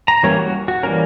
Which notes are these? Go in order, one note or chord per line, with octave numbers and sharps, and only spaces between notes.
A#5
E3 G3 A#3 C#4 C#5
F#4
F#4
E3 G3 A#3 C#4 A#4